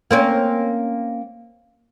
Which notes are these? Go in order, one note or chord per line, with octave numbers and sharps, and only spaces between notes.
A#3 C4 C#4